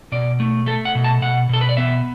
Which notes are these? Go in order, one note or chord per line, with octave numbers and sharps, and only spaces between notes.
B2 D5
A3
A3 A4
F#5
B2
A5
B2 F#5
B2 A4
B4
D5
B3 E5